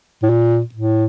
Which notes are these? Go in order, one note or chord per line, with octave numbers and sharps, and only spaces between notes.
A2
A#2
A2